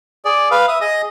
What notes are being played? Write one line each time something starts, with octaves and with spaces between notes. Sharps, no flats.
G#4 D5
B4 F5
E5 D#6
G#4 D#5 D#6